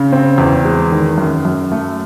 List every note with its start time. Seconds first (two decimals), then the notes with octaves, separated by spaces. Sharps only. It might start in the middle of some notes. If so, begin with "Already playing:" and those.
Already playing: C#3
0.12 C4
0.38 E2
0.65 G#3
0.92 D#3
1.18 F#2
1.45 F#2
1.72 A3